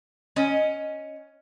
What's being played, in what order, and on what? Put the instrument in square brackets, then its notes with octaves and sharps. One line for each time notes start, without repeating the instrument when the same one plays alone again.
[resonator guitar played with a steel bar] C#4 D#5